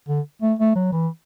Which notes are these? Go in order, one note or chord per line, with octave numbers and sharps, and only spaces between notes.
D3
A3
A3
F#3
E3